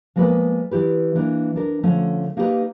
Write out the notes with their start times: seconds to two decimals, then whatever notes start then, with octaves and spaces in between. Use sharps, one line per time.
0.16 F3 G#3 A#3 B3 B4
0.71 E3 E4 G4 B4
1.15 E3 A#3 D4
1.56 D4 A#4
1.83 D3 F3 A3 C#4
2.37 A#3 D#4 G4 G#4 B4 D5